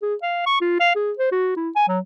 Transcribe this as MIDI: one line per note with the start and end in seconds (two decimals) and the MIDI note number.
0.02 0.15 68
0.22 0.44 77
0.46 0.59 85
0.61 0.75 65
0.80 0.91 77
0.96 1.12 68
1.18 1.30 72
1.32 1.53 66
1.57 1.70 64
1.76 1.85 80
1.88 1.99 54